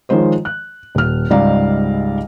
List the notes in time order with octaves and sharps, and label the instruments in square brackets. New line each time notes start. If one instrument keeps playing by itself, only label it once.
[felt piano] D#3 F3 G#3 C5 C#5
F#6
D#1 F6
C#2 G#2 G3 D5 F5 A#5